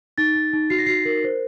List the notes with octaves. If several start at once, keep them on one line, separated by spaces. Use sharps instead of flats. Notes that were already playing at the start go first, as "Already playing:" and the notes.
D#4 A6
D#4
D#4
F#4 C7
A#6
F#4 C7
A#4
C5